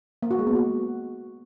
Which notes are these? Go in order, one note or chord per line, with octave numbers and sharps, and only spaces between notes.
A#3
F#4
G#3
B3
F#4